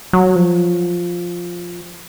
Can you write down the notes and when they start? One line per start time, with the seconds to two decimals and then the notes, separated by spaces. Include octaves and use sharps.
0.13 F#3
0.36 F3